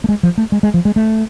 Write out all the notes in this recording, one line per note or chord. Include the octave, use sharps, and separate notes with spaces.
A3
G#3
F3
A3
G#3
G#3
F3
G#3
A3